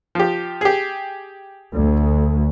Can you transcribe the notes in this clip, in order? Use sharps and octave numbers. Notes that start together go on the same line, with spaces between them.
F3 G4
G4 G#4
D2